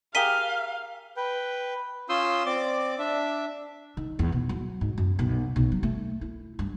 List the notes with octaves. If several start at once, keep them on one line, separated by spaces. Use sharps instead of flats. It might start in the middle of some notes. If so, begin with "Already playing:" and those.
G4 G#4 A#4 F5 B6 D#7 G7
B4 G5
C#4 F4 C6 D#6 E6 G6
C4 D5 D6
D4 E5
D#3
E2
B2
F#3
G#2
F#2
B1
B1
F#3
A3
E4
G2